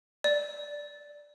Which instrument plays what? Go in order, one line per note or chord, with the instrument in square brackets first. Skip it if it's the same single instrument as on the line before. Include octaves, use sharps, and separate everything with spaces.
[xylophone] D5